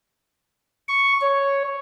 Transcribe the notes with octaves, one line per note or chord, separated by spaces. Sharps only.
C#6
C#5